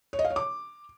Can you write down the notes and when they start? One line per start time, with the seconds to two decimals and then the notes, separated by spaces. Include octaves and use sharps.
0.13 C#5
0.19 D#5
0.25 F5
0.30 C#5
0.36 D6